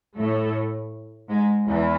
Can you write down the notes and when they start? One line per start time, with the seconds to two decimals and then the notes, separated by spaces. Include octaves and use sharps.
0.16 A2 A3
1.29 G#2 G#3
1.66 E2 E3